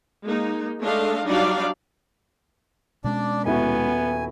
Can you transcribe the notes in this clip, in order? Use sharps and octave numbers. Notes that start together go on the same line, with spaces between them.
G#3 A#3 D#4
G#3 A3 D4 A4 D#5 F5
F#3 G3 D4 D#4 D5 F5
B2 G#3 C#4 D4 D5
D#1 B3 E4 F#4 G#5